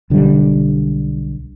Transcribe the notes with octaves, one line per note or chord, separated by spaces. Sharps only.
B1 D3 D#3 G3